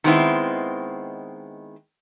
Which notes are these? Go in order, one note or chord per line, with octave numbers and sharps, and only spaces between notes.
D#3 G#3 A3 B3 C4 E4